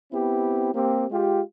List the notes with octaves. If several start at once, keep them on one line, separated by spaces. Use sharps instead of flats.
B3 C4 E4 G4
A#3 C4 G4
G#3 F4 G4